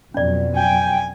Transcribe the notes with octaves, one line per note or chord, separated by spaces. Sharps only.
F2 B2 F#3 C#4 D5
G5 G#5